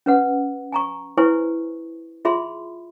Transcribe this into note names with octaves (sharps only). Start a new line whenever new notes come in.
C#4 B4 F#5
G#5 A#5 C#6
E4 B4 C5 G#5 C#6
F4 G#4 E5 B5 C6